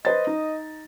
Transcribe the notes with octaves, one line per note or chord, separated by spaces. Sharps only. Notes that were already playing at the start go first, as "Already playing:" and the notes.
B4 C5 D#5 A6
D#4